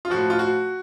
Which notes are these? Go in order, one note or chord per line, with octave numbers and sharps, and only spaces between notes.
F4
A2 F3 F#4
F4
F#4